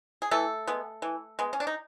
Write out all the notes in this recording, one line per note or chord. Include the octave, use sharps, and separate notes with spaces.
G#4
E3 A3 A4
G#3 B3
E3
G#3 B3
C#4
D4
D#4